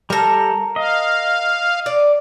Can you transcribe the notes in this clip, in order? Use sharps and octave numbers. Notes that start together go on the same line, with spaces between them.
G3 A4 A#4 A#5
D#5 F5
D5